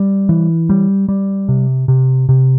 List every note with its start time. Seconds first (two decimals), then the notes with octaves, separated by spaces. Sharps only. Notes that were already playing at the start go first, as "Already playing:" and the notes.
Already playing: G3
0.29 E3
0.69 G3
1.09 G3
1.49 C3
1.88 C3
2.29 C3